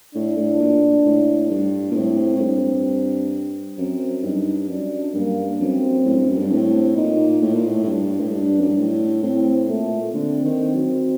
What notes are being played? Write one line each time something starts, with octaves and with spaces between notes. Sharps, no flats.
A2 D4
A2
A#2
A2
G2
A#2
A2 C4
A2
G2
F#2 C4
G2 D#4
F#2 D4
G2 A#3
F#2 C4
A2
G2
F#2
G2
A2 C4
A#2 D#4
A2
A#2
A2
A2
G2
A2
G2 D4
F#2
G2
A2
A2 C4
A#2 A3
D3 C4
D#3
F#3